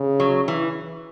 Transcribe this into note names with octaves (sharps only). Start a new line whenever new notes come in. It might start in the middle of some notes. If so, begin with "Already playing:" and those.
Already playing: C#3
F#3
E3